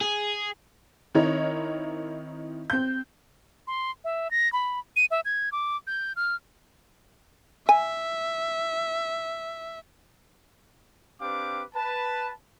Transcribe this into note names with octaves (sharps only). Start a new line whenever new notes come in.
G#4
D#3 C4 E4 A#4 C#5 D#5
C4 G6
C6
E5
A#6
B5
D#7
E5
G#6
D6
G6
F6
E5 G#5
C4 D4 G4 B4 F5 D6
B4 A5